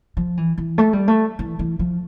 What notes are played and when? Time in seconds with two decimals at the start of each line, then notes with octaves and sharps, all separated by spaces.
0.17 F3
0.37 E3
0.58 E3
0.78 A3
0.93 G3
1.08 A3
1.39 E3
1.59 E3
1.79 F3